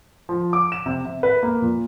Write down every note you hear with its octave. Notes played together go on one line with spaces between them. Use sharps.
F3
D6
E7
C3
C3
B4
A#3
A#2